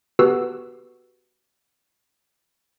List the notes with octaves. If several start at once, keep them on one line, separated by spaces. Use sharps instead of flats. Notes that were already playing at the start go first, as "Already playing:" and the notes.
B3 F#4 G4 A4 B4 E6